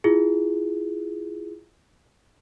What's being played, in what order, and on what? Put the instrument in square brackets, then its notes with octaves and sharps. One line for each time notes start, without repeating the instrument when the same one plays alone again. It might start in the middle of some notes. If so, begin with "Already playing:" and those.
[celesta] E4 F4 G#4